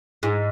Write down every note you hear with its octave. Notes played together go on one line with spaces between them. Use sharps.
G#2